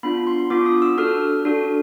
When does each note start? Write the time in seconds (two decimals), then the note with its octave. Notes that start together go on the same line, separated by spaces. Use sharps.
0.03 B3 D4 F4 B5
0.27 C6
0.50 B3 D4 F4 D6
0.66 D#6
0.82 E6
0.98 D4 F#4 A4 F6
1.45 D4 F#4 A4